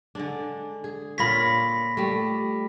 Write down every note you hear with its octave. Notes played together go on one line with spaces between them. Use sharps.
D3 G#3 D4
G#4
A#2 F4 C#5 B5 A#6 B6
G3 A3